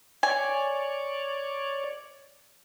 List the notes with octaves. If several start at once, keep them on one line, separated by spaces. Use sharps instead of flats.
C#5 D5 G#5